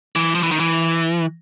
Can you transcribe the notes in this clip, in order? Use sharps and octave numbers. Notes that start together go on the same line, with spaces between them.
E3
F3
E3
D#3
E3